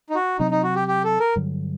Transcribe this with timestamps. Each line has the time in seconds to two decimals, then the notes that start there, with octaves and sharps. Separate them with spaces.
0.10 D#4
0.15 F#4
0.39 C3 F#3 C4 D#4
0.51 D#4
0.64 F#4
0.75 G4
0.88 G4
1.04 A4
1.20 A#4
1.36 G2 D3 F#3